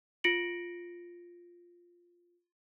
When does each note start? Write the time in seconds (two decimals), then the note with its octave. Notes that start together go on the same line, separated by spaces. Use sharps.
0.24 F4 A#6 C#7 D7 F#7